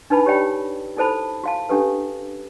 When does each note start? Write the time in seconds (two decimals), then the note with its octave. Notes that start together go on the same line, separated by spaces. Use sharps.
0.10 D4 D#4 B4 A5 B5
0.26 G4 C#5 D5 G5 B5
0.97 D#4 E4 A4 C5 A5 B5
1.44 F#4 F5 A5
1.69 C#4 D4 G4 A4 B4